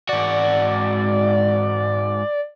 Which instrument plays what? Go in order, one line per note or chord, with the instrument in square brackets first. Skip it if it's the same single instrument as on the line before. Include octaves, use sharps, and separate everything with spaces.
[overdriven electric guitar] G#2 F#4 [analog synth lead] D5